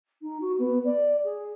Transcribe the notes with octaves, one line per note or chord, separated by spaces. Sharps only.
D#4
F#4
B3
D5
G#4